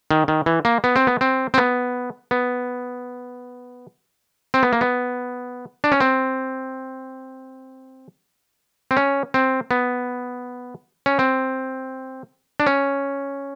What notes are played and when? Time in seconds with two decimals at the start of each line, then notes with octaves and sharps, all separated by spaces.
0.11 D#3
0.28 D#3
0.46 E3
0.65 A#3
0.84 B3
0.96 C4
1.07 B3
1.21 C4
1.54 C4
1.58 B3
2.31 B3
4.54 C4
4.63 B3
4.73 A#3
4.81 B3
5.84 D4
5.92 C#4
6.01 C4
8.91 C4
8.97 C#4
9.34 C4
9.71 B3
11.06 C#4
11.19 C4
12.60 D4
12.67 C#4